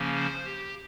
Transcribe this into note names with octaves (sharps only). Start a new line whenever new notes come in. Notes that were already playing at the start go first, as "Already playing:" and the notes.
Already playing: C#3 F3 A#3 C#4
C5
G4